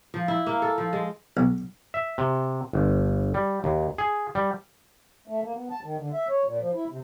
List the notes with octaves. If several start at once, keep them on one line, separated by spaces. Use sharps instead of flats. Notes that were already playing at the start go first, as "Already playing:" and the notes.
F3
E4
A#3
A4
F3
G#3
B1
E5
C3
G1
G3
D#2
G#4
G3
A3
A#3
B3
A5
D#3
D3
E5
C#5
A#2
F3
E4
C3